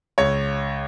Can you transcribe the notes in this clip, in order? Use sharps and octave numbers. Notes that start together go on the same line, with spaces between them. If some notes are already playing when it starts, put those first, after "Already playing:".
C#2 C#5